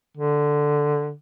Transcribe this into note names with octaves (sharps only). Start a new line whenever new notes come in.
D3